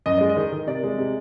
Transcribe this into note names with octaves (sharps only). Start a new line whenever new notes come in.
F#2 D#5
G#3 D5
D#5
D#3
D#3
C3 D5
G#3
C3